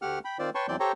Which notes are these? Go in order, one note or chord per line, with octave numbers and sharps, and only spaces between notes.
D2 A3 G4 F#5 F6
G5 B5
D#3 C4 F4 C5 D5
B4 C#5 G5 A5 C6 C#6
E2 E3 F#3 C4 D5 G6
G4 A4 C5 C#5 G5 A#5